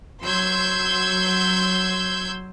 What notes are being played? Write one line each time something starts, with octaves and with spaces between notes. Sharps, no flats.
F#3 C6 E6 G6 G#6